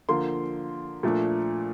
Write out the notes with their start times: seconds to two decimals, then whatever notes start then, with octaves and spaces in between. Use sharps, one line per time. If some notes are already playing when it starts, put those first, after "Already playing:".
0.09 D3 F3 A#3 C6
1.03 A#2 F3 A3 D4